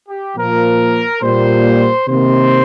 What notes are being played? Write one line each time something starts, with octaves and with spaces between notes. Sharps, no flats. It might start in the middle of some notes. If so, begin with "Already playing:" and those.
G4
A#2 F3 A#3 A#4
A#2 G3 A#3 C5
C3 D#3 A#3 C5